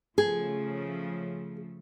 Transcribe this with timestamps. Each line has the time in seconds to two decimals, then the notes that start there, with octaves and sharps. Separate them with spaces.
0.18 C#3 F3 A3 G#4